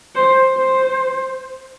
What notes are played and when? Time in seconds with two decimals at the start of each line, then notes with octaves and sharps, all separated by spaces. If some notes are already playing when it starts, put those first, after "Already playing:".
0.15 C5
0.56 C5